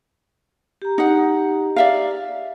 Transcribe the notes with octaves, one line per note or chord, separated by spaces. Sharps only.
G4 A#5
D#4 F#5
D5 E5 F5